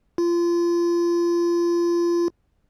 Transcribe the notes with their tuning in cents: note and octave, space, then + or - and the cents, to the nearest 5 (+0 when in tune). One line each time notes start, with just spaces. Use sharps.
F4 -25